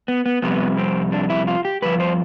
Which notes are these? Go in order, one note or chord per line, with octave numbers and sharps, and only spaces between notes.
B3
B3
F2 C3 G3 B3
C4
D4
E4
F4
G4
G2 F3 B4
C5